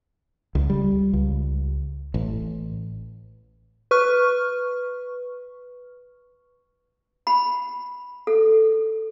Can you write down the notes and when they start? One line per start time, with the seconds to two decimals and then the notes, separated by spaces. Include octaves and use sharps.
0.55 C#2
0.70 G3
1.13 C#2
2.14 A1
3.91 B4 C#6 F6
7.27 B5
8.27 A4